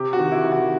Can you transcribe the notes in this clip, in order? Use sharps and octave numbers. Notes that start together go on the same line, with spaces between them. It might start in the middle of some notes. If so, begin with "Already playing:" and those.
Already playing: C3 G4
F#4
D#3
E4
D#3
F#4